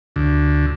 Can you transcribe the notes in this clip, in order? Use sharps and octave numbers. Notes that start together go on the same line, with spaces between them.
D2